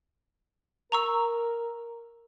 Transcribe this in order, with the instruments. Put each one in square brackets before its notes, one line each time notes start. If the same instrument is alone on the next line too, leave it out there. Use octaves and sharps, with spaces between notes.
[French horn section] A#4 [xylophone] A#5 C#6 E6